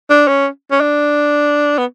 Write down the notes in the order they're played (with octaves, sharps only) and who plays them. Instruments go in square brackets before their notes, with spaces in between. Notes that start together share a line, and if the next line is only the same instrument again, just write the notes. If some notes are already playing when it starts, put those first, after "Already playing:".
[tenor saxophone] D4
C#4
C#4
D4
B3